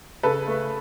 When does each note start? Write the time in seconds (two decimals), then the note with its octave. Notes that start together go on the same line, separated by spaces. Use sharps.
0.23 C#3 A4 B4
0.47 A3